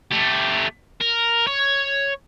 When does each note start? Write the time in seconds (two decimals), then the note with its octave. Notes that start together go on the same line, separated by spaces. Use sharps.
0.11 A3 G4
1.01 A#4
1.47 C#5